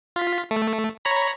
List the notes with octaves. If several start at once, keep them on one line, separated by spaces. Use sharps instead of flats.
F4 B6
A3
C#5 A#5 B5